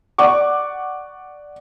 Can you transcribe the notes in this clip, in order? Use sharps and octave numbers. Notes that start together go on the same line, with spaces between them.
D5 F#5 C#6 D6